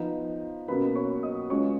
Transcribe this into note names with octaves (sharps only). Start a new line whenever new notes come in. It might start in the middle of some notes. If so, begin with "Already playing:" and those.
Already playing: F3 B3 D#4
B2 F#3 A#3 C#4 B4 B5
C#5 C#6
D#5 D#6
C#3 G#3 B3 F4 C#5 C#6